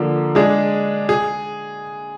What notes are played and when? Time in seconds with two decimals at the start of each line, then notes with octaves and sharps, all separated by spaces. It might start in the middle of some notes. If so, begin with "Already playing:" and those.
Already playing: D3 F3 A#3
0.35 G#3 D4 G#4
1.09 G#4